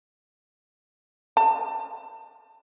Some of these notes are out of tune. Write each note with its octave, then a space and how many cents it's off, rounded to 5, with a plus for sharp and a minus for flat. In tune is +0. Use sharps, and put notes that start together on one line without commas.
A5 +30